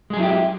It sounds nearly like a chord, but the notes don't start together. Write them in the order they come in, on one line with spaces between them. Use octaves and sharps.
G#3 G#4 F#3 E4 G4